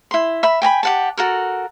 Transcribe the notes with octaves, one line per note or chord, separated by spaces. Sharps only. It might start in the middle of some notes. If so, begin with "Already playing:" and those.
E4 C6
E5 B5
G5 G#5 A#5 B5
G4 F#5 A5
F#4 A4 A#4